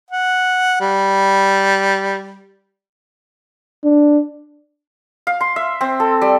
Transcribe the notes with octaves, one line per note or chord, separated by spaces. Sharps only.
F#5
G3
D4
F5
C6
E5
C4
A4
G3